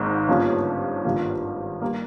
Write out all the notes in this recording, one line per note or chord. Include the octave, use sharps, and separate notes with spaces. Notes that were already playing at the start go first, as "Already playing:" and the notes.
Already playing: G#1 G#2 A#3
G1 G2 F3 A#3 C#4
G#1 G2 F3 A#3
G3 A#3